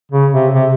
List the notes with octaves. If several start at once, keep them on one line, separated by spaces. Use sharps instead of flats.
C#3
C3
C3